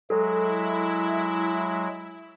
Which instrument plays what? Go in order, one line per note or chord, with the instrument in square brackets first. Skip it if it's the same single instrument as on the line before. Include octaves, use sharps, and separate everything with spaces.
[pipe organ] F#3 G#3 [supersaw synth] E4 [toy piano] A4